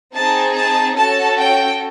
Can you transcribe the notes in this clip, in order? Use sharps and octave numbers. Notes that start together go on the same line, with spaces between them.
C4 D#4 G#4 A5
A5
C#4 F#4 A4 A5
G5